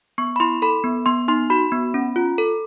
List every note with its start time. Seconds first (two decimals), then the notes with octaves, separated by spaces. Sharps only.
0.18 B3 C#6
0.36 B5
0.40 E4 C6
0.62 A4 B5
0.84 B3
1.06 B3 C6
1.28 D#4 C6
1.50 F#4 B5
1.72 B3
1.94 C#4
2.16 F4
2.38 A4